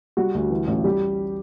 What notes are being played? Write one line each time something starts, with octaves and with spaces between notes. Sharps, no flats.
G3 F#4
D2
E3
A1
G3 G4